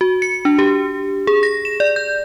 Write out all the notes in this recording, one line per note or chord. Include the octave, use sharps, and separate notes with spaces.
F#4
C#7
D4
G4
G#4
A#6
E7
D5
G6